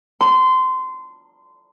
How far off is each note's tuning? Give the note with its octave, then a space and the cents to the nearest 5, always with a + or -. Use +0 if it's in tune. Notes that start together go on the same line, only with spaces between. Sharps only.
C6 -20